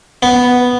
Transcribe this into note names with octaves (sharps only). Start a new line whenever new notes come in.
B3